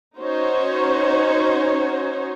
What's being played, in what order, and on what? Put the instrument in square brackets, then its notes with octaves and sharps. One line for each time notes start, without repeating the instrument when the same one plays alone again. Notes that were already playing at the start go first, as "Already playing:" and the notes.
[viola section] C#4 D#4 F#4 C5 C#5